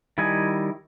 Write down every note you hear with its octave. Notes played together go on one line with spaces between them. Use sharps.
D#3 G3 E4 D#5 G#5